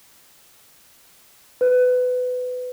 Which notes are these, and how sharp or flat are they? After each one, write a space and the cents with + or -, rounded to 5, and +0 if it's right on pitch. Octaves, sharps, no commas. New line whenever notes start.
B4 +25